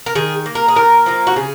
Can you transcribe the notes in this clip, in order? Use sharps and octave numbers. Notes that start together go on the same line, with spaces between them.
A#4
D#3 G#4
A#3
A#4
G#4
A#2 A#4
F3 A#3
F#4
C#3 G#4